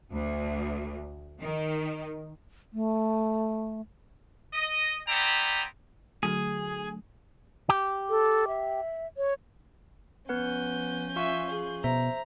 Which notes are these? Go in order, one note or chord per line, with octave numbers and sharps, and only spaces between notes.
D2
D#3
A3
D#5
B3 E4 C5 D5 G5 A#5
D3 F#3 A3 G#4
G4
A4
E5
C#5
F3 B3 C#4 B4 F#5 G6
F4 E5 F5 G#5 C#6
G#4
B2 C5 E5 A#5